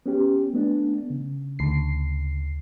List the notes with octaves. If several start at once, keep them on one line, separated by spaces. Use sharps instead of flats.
B3 C#4 G4
A3 B3 D4
C#3
D2 C7